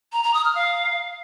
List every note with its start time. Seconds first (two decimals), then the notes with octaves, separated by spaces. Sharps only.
0.13 A#5
0.23 A#5
0.34 D#6
0.45 F6
0.55 F5